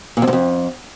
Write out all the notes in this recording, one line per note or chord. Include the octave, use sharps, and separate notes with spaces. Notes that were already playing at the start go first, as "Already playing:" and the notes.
A#2
F2
G#2
F2